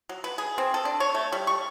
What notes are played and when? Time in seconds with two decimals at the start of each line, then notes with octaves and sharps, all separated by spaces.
0.09 F#3
0.24 B4
0.38 G#4
0.58 C4
0.74 A4
0.85 D4
1.00 C#5
1.15 A3
1.32 G3
1.47 C#6